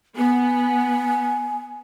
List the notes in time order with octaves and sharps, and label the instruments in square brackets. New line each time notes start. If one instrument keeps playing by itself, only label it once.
[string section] B3 [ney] G#5